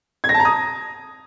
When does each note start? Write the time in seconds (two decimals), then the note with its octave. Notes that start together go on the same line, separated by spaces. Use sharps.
0.24 G#6
0.29 A#6
0.34 A5
0.40 A#5
0.45 D#6